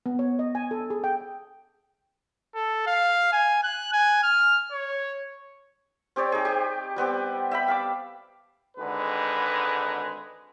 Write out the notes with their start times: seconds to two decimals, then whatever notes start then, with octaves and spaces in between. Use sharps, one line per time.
0.06 B3
0.19 C#5
0.39 D#5
0.55 G#5
0.71 A4
0.90 G#4
1.04 G5
2.56 A4
2.87 F5
3.32 G#5
3.64 F#6
3.93 G#5
4.23 F6
4.72 C#5
6.16 C4 G4 C#5 D5
6.32 D#4 G#4
6.45 G4
6.96 G3 B3 C4 G4
7.51 E5 G5 B5
7.68 F5 A5 D6
8.78 G#1 D3 G#3 D#4 B4